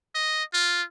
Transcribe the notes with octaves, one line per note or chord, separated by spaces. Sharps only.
D#5
F4